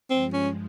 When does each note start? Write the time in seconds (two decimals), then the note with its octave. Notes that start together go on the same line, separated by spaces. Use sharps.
0.10 G2 F3 G#3 C4
0.33 C#4